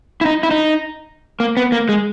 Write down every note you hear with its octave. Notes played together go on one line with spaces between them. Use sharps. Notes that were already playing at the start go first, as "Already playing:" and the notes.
E4
D#4
E4
D#4
A#3
B3
A#3
G#3